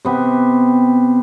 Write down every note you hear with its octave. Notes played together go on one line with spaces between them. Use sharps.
C3 B3 G4